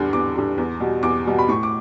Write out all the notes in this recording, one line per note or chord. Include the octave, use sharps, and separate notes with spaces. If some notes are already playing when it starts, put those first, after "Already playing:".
Already playing: E2 D3 G3
E2 D6
D3 G3
E2
B2 G3
E2 D6
B2 G3
B5
A2 C#6
D6